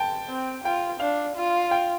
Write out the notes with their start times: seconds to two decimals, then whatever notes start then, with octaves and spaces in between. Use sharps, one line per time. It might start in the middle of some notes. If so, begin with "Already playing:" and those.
Already playing: G5 A5
0.29 C4
0.64 F4 G5
1.00 D4 F5
1.36 F4
1.71 G5